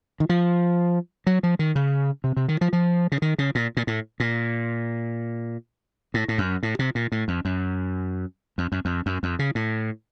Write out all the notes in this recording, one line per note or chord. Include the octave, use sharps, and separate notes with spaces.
D#3
F3
F#3
F3
D#3
C#3
C3
C3
D#3
F3
F3
C#3
D#3
C#3
A#2
A#2
A2
A#2
A2
A2
F#2
A2
C3
A#2
A2
F2
F#2
F2
F#2
F2
F#2
F2
C#3
A2